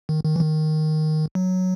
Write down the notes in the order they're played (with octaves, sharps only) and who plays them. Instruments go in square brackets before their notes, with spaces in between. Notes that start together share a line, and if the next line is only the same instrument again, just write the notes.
[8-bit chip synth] D#3
D#3
E3
D#3
F#3